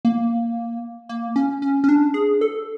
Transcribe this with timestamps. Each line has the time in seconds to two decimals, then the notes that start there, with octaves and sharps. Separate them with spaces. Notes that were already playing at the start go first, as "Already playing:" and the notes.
0.05 A#3
1.09 A#3
1.36 C#4
1.62 C#4
1.84 C#4
1.89 D4
2.14 G#4
2.41 A4